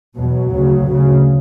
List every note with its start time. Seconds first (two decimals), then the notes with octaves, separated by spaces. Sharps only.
0.16 E2 B2 F#3
0.50 D2 C#3
0.84 D2 C#3